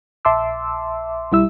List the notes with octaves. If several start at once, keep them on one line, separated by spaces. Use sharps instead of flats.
A#1 E5 A5 C6 D6 E6
B1 G3 E4 E5 E6